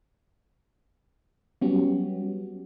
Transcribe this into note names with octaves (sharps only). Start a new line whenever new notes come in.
F#3 G3 B3 C#4 F#4 G4